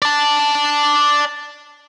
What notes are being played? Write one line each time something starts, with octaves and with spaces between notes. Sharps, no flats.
D5 A5